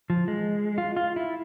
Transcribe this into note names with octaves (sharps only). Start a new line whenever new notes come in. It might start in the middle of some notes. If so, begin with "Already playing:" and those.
F3
G#3
F4
F4
E4